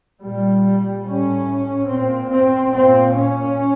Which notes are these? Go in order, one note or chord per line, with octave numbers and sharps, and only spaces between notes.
A#2 G3
A2 C#4
A#2 C4
C4
A#2 C4
C#4